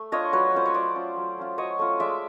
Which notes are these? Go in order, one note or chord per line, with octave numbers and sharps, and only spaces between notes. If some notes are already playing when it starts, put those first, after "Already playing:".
Already playing: A3
D4 F4 C#5 D#5
F#3 B4 C#5
A3 C#4 F4 C5
C#5
F#3 C5 D5
A3 C#4 F4
F#3
A3 C#4 F4
F#3 C#5 D#5
A3 C#4 F4
G#3 D5 E5